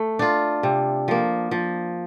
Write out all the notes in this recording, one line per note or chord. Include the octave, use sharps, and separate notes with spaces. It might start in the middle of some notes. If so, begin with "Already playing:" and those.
Already playing: A3
D4 F4
C3
F3 A#3
F3